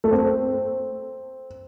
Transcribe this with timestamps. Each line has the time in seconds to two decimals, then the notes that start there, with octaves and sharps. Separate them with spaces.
0.04 A3
0.11 C4